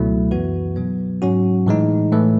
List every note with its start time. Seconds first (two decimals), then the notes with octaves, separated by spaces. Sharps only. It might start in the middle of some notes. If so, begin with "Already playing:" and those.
Already playing: C#2 B2 F#3 A3 E4
0.31 F#2 E3 B3 F#4 B4
0.76 B2 F#3 B3
1.22 G#2 F#3 C#4 F#4
1.66 A2 E3 G#3 D#4
2.12 A2 E3 A3